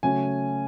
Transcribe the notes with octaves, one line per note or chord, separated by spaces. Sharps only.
C#3 F#3 A3 C#4 G#5